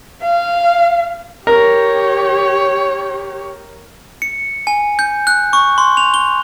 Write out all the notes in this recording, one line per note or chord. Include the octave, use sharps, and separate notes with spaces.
F5
G4 A#4 C#5
C#7
G#5
G6
F#6
C#6
C6
F7
G7